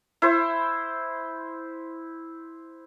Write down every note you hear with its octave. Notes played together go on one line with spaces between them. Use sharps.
E4 C5